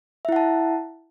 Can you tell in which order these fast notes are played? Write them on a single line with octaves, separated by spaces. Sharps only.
E5 E4 F#5 A5